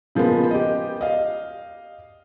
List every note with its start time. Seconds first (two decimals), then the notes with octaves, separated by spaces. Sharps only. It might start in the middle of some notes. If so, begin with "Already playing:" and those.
0.15 C#3 F3 G#3 A#3 B3
0.51 G4 D#5
1.01 D#5 F5